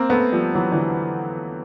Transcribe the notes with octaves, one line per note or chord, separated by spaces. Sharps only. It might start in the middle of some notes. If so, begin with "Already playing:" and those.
Already playing: A#3 C4
A3 B3
F3 G3
E3 F#3
D3 E3